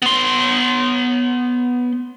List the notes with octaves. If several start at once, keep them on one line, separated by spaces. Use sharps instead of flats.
B3 C6